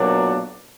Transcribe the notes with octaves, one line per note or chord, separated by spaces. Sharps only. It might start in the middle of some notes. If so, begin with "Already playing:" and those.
Already playing: B1 A#2 F#3 A#3 D4